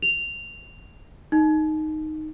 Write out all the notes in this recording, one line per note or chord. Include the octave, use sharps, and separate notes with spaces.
F7
D#4